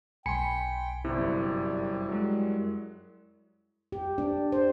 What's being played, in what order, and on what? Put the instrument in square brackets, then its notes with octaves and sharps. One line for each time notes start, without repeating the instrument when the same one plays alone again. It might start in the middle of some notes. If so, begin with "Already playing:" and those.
[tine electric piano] B1 G#5 C#7 [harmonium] G5 [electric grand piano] B5 C6
[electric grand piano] G1 C3 [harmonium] F#2 G3 [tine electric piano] E4
[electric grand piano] F#3 G#3
[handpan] G4
D4
C5